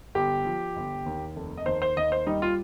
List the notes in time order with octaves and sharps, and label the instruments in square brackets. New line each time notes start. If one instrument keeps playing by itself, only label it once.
[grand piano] G1 G4
F3
G1
D#2
F1
D#5
D#2 C5
C5
D#2 D#5
C5
G3 D#4
F4